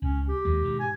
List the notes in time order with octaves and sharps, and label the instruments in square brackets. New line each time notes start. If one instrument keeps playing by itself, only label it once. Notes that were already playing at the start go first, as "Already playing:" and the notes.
[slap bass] C#2 [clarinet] C#4
[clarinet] G4
[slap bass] D#2 G#3
G#2 B2 D#3
[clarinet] G#5